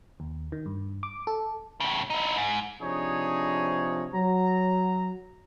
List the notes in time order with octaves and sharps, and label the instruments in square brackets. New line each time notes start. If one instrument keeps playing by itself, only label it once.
[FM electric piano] D#2
D#3
G2
D6
A4
[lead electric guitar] A2 C#3
D#4 E4
G#2
[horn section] C3 F3 D4 D#4 G#4 C#5
F#3 A#5